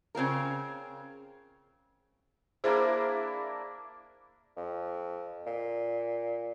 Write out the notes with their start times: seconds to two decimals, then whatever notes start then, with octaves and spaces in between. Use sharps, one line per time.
0.15 C#3 C4 F4 A#4
2.64 A#3 D4 E4 G#4 C5
4.57 F2
5.46 A#2